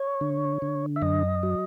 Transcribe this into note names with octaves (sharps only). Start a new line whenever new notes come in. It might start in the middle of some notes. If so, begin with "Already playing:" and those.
Already playing: C#5
D3
D3
E5
F#2 D#5
F#3